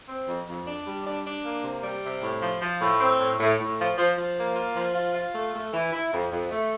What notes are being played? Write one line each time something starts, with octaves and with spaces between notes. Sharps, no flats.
C4
F2
F2
D4
G3
D4
D4
A#3
C3
G3
C3
A2
F3
F3
A2
C4
A2
A2
A2
F3
F3
F3
A#3
F4
F3
F4
F4
A3
A3
E3
E4
F2
F2
A3